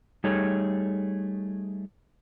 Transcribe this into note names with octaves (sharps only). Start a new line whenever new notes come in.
G3 A3 D#4 G#4 A4 C#5